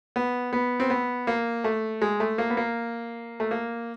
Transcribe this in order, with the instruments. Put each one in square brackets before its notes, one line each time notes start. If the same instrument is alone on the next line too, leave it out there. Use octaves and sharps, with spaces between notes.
[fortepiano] B3
B3
C4
B3
A#3
A3
G#3
A3
A#3
B3
A#3
A3
A#3